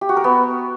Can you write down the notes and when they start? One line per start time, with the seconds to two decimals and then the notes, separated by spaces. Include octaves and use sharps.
0.01 G4
0.09 F#4
0.17 A#4
0.24 B3